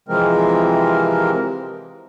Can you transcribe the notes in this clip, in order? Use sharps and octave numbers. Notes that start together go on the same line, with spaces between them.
C3 E3 F3 G#3 C4 A#4